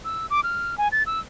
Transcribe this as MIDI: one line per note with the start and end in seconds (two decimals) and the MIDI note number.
0.05 0.26 88
0.30 0.40 86
0.44 0.78 89
0.78 0.88 80
0.92 1.03 93
1.06 1.20 88